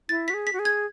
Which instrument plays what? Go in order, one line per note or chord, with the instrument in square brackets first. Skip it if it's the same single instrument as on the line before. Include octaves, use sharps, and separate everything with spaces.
[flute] E4 [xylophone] A6
[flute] F#4 [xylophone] B6
[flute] G#4
[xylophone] B6
[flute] F#4
G#4
[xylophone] G#6